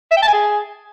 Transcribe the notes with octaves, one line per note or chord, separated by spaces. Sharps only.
E5
G5
A5
G#5
G#4